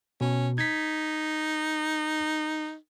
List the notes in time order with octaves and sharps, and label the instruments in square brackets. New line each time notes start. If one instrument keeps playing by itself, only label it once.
[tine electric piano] B2 [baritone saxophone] C#4
[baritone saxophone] D#4 [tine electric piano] G#6 B6